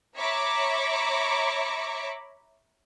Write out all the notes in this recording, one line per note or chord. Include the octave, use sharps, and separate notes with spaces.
C#5 E5 A#5 B5 C#6 D6